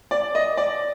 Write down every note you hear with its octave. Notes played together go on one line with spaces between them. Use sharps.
D5
D#5
D5